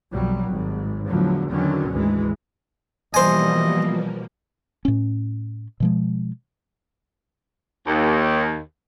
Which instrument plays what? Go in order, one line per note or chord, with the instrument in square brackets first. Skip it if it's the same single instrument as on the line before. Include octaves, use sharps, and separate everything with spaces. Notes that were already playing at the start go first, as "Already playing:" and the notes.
[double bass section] B1 F2 F#3 G3
G#1 G#2
E2 A2 D3 F3 F#3
E2 D3 D#3 F#3 C#4
G#1 D2 E3 G#3
[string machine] B2 F3 A#3 [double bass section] E3 G3 [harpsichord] C5 G#5 [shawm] D#5
[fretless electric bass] A2 C#4
B2 F3 G#3
[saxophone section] D#2